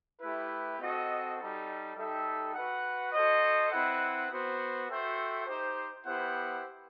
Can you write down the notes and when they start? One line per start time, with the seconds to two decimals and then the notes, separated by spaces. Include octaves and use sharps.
0.21 A3 E4 G4 B4
0.79 C4 F#4 A4 D#5
1.37 G3 D#4 A4
1.96 G3 D#4 A4 E5 G5
2.54 F#4 B4 F#5
3.12 F#4 A4 C5 D#5
3.71 C4 E4 B4 F#5
4.30 B3 F#4 C5
4.89 F#4 A4 C5 E5 G5
5.47 D#4 G4 C5
6.06 B3 E4 G4 C5 F#5